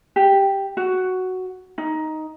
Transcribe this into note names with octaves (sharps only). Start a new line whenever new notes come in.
G4
F#4
D#4